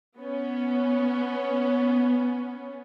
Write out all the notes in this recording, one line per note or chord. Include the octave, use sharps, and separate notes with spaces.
B3 C#4